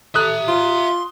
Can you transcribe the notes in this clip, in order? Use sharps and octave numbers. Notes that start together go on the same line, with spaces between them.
A4 E5 A#5 D#6 F#6
F4 C6